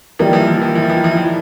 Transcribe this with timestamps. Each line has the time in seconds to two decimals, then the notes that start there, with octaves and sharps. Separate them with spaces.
0.19 D#3 E3 G3 A#3
0.26 F3
0.33 E3
0.41 F3
0.47 E3
0.54 F3
0.61 E3
0.69 F3
0.75 E3
0.82 F3
0.90 E3
0.97 F3
1.04 E3
1.11 F3
1.17 E3
1.24 F3